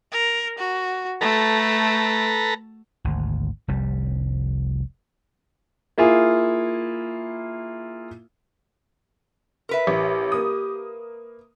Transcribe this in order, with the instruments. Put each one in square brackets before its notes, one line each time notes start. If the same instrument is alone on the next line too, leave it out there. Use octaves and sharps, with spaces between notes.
[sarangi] A#4
F#4
[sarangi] A3 [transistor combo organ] A4 B4 A#5
[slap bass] G#1 D2
F1 C2 G3
[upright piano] A#3 E4 F4 G#4
[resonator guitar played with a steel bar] A#4 B4 E5
[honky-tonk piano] A1 [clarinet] G4
[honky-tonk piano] A#3 D#6